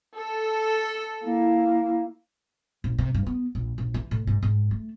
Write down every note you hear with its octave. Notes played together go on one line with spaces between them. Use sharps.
A4
A#3 E4
A#1
C3
G2
B3
A#1
A#1
E3
A2
G#2
G#2
A3